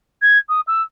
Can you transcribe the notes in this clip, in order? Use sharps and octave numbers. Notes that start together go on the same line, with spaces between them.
G#6
D#6
E6